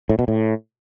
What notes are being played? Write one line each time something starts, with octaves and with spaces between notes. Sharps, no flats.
A2
B2
A2